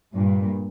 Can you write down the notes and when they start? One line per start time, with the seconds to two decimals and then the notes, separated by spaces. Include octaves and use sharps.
0.15 G2 A#2